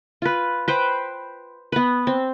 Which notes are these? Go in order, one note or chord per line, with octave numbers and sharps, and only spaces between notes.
F4 B4
B4 C5 G5
B3 B4
C4